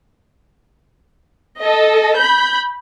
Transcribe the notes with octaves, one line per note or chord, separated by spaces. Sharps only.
A4 D#5
B5 G6